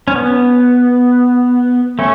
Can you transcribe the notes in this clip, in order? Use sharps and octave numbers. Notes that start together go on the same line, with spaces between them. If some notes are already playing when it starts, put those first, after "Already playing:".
C#4
B3
A3 C#4